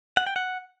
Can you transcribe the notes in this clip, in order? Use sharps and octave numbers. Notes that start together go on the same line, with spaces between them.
F#5
G5
F#5